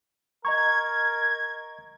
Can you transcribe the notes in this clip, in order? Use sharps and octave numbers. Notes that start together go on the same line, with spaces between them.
A#4 D#5 A#5 C#6 G#6